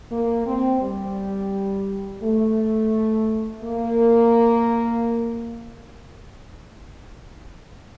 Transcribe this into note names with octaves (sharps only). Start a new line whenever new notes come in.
A#3
C4
G3
A3
A#3